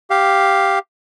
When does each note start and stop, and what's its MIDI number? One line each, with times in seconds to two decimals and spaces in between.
0.10 0.79 67
0.10 0.79 77